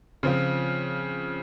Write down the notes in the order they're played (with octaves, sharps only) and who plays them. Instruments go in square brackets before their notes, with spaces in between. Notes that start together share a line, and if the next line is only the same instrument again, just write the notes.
[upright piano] C#3 F3 C4 F4